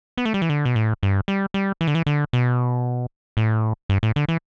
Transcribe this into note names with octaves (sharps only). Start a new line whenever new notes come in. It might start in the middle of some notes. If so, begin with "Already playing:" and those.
B3
A3
G3
E3
D3
B2
A2
G2
G3
G3
E3
D3
E3
D3
B2
A2
G2
A2
D3
E3